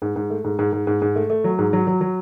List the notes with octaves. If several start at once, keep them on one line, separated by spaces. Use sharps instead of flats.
G#2
G#2
A3
G#2
G#2
G#2
G#2
G#2
A3
A3
F#3
G#2
F#3
F#3
F#3